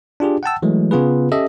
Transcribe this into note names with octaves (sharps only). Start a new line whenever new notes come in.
D4 F4 G4 G#4
F#5 G5 A5 E6
E3 F#3 G#3 A3
C#3 B3 F4 G#4 B4
C#4 G4 A4 D#5 E5